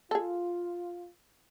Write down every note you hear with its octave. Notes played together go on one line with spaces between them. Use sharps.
F4 G#4 A4